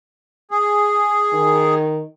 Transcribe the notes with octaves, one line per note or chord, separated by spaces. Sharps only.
G#4
D#3